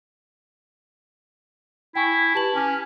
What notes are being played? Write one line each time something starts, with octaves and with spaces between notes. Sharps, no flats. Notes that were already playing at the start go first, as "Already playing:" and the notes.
E4 G5 G#5 C#6
G4 B4 A5 F#7
C#4 G#5 D6 F6